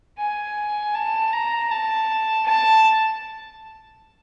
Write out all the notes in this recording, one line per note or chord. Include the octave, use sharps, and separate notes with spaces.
G#5
A5
A#5
A5
A5